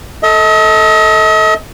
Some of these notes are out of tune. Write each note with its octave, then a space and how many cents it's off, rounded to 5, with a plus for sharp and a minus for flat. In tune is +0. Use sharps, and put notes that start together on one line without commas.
A4 +0 D#5 +40